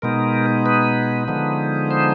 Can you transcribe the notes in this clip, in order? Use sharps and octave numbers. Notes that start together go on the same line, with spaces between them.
B2 G#3 B3 D#4 A#4
B4
D3 F3 G#3 B3 D#4
C5